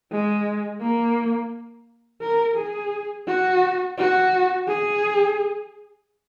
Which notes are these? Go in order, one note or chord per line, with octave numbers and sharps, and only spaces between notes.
G#3
A#3
A#4
G#4
F#4
F#4
G#4